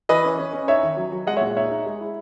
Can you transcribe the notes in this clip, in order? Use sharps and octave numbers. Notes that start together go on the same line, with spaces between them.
E3 B4 D#5
C#4
C#4
C#4
D#4 C#5 E5
D#3
F#3
F#3
G#3 D#5 F#5
C#5 E5
A#2
D#4 C#5 E5
D#4
G#3
E4